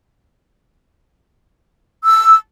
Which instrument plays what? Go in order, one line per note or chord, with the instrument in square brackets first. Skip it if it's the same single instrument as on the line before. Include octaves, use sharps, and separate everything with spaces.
[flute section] E6